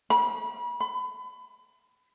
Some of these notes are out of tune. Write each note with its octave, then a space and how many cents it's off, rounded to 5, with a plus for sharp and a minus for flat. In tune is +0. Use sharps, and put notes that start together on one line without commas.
B5 -35
B5 +30